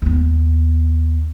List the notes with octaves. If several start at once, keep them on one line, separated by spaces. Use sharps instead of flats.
D#2 B3